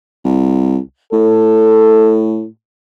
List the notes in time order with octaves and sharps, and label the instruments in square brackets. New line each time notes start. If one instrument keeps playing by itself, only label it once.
[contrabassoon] C2
[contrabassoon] A2 [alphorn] A4